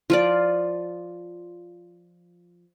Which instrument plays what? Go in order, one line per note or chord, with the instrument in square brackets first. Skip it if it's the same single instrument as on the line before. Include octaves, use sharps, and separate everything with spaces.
[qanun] F3 F4 D5